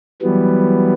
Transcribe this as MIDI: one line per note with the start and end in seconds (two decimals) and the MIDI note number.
0.22 0.93 52
0.22 0.93 54
0.22 0.93 55
0.22 0.93 59